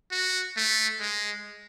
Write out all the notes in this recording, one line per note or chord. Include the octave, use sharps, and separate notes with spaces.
F#4
A3
G#3